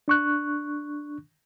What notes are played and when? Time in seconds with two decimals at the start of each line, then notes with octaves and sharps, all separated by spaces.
0.08 D4 C#6 F#6